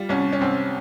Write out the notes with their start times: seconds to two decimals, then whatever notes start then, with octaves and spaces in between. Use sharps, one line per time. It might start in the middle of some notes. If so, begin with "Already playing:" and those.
Already playing: G3 F4
0.09 C2 C#4
0.33 C#4
0.41 C2 C4